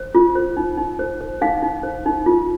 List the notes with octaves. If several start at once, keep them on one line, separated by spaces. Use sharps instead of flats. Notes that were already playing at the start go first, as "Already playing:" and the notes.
Already playing: C5
F4
C5
D#4
D#4
C5
C5
D#4 F5
D#4
C5
D#4
F4